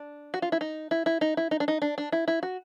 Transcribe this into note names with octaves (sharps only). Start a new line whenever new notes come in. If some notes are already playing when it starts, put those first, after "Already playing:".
Already playing: D4
F#4
F4
E4
D#4
E4
E4
D#4
E4
D#4
D4
D#4
D4
D4
E4
E4
F#4